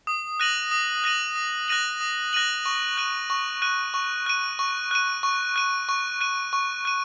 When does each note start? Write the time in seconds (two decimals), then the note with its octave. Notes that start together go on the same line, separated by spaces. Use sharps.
0.07 D#6
0.40 F#6 A#6 D#7 F#7
0.71 D#6
1.04 F#6 A#6 D#7 F#7
1.36 D#6
1.68 F#6 A#6 D#7 F#7
2.01 D#6
2.33 F#6 A#6 D#7 F#7
2.66 C#6
2.97 F#6 D#7
3.30 C#6
3.62 F#6 D#7
3.94 C#6
4.26 F#6 D#7
4.59 C#6
4.91 F#6 D#7
5.23 C#6
5.56 F#6 D#7
5.89 C#6
6.21 F#6 D#7
6.53 C#6
6.85 F#6 D#7